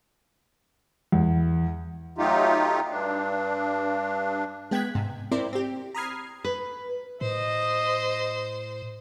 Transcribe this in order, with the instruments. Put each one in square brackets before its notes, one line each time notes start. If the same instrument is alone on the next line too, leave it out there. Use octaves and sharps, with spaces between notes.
[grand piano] E2
[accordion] F#3 A3 D#4 F4 G4
G2 D4
[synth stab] G#3 B3 G5 F#6 G#6 B6
G#2 C3
C4 E4 A#4 C5 D5
C4 G4
A#5 B5 D#6 F6 G#6 C7
[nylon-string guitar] B4
[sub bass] A2 [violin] C5 [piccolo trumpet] D#5